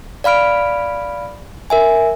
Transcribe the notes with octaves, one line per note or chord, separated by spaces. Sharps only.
D5 F5 B5 F6 D7
A#4 E5 G#5